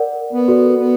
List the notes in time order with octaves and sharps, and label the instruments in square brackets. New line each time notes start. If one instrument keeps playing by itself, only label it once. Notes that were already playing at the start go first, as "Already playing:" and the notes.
Already playing: [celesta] A#4 D5 F#5
[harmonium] B3
[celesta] F#4 A4 D5
[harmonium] B3